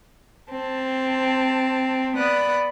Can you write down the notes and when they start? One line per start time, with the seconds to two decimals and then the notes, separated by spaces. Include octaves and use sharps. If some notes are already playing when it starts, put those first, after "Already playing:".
0.52 C4 A5
2.17 B3 D5 B5 D#6 F#6